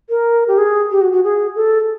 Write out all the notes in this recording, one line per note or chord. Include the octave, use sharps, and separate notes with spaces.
A#4
G4
G#4
G4
F#4
F#4
G#4
A4